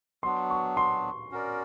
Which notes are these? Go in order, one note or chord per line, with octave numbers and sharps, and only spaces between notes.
F#3 B3 D4 C6
C#6
C6
C#4 F#4 A#4 D5